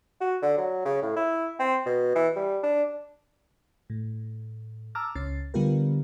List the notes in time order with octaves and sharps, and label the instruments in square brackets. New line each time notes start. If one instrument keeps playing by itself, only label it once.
[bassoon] F#4
D3
F#3
C#3
A2
E4
C4
B2
E3
G3
D4
[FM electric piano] A2
A5 A#5 D6 E6 F6
C#2 C#4 A6 C7
D3 G3 B3 F4 G4 A#4